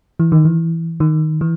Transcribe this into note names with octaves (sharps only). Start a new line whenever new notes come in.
E3
D#3
E3
D#3
E3